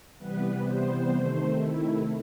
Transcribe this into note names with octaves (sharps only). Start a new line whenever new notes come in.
C3 E3 G3 B3 B4
C5
C3 D#3 A3
E4